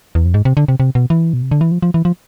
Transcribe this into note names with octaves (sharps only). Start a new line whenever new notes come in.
E2
F2
G#2
C3
D3
C3
C3
B2
E3
B2
C3
D3
E3
F3
F3
E3
F3